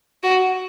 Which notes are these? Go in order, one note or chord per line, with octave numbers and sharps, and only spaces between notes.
F#4